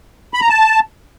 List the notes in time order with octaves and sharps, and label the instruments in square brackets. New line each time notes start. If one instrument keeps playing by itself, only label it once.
[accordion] B5
A#5
A5